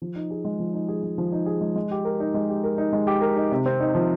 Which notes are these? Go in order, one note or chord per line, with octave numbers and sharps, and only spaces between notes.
F3
D#4
G#4
G#3
F3
D#4
G#4
G#3
F3
D#4
G#4
G#3
G#3
G4
A#4
D#4
G#3
G4
A#4
D#4
G#3
G4
A#4
D#4
C3
C4
D#4
F3